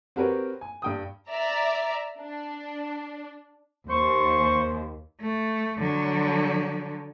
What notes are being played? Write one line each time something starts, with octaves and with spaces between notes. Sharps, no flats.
C4 F#4 G4 A#4 B4 C#5
G#5
G2 G5 D#6
D5 E5 A#5
D4
D#2 C5 C#6
A3
D3 F#3